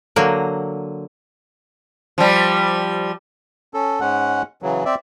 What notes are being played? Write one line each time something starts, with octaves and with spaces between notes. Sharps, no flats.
D3 F#3 A#3
F3 G3
C#4 A4
G#2 G#3 C#4 F#5
C#3 E3 F#3
C4 D5 E5